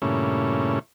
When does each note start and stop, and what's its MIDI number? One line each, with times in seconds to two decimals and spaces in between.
0.02 0.79 43
0.02 0.79 46
0.02 0.79 49
0.02 0.79 57
0.02 0.79 61
0.02 0.79 64